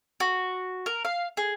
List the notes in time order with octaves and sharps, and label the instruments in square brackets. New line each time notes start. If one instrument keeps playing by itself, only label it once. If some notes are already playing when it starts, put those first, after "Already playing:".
[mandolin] F#4
A#4
F5
G#4